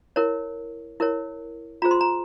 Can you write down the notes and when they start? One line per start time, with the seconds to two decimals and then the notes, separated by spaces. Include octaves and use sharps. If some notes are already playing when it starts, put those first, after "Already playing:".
0.16 E4 A#4 C#5
1.00 E4 A#4 C#5
1.82 F4 G#4 C5 A#5
1.91 C6
2.01 A#5